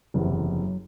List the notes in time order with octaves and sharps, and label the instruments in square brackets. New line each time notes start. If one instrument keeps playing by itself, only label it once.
[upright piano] F#1 E2 C3 [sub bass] F3
[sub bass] E3
F3
F#3